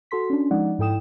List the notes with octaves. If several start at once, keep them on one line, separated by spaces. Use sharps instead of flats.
F#4 A4 C6 B6
C#4 D4
F3 G#3 D#4 D5 F#5
G#2 E4 A4 G5 D#6 E7